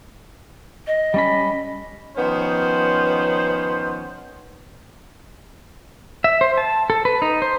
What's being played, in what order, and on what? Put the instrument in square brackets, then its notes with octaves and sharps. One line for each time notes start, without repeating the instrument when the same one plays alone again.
[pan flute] D#5
[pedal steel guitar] G3 C#4 B5
[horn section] D#3 F3 B3 C#4 C5
[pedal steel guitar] E5
C5
A5
A4
B4
D#4
C5